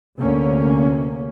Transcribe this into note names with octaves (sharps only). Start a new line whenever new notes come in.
D2 C3 A#3 C#4